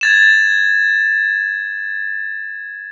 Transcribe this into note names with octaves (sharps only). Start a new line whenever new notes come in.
G#6 A6 E7